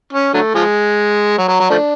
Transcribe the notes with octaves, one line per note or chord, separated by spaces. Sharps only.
C#4
D3 F#3 A3
F3 G#3
F#3
F#3
F#3
F3 A3 D4